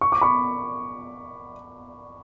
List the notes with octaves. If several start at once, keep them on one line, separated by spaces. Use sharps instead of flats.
C#6
D6
B5 C#6